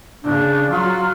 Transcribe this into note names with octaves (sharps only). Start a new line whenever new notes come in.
C#3 D4
F#3 F4